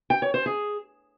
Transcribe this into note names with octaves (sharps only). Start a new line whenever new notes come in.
G5
C#5
C5
G#4